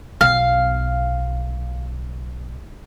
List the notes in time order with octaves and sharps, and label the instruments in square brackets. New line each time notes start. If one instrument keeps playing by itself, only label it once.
[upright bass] B1 B2 [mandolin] F5